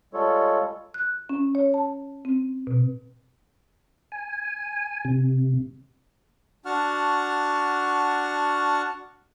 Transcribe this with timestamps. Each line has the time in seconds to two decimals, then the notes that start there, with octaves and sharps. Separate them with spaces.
0.14 G3 G#3 F4 A4 C#5
0.94 F#6
1.29 C#4
1.55 C#5
1.74 A5
2.25 C4
2.67 B2
4.12 G#5
5.05 C3
6.66 D4 F#4 F#5 A5 C#6 F6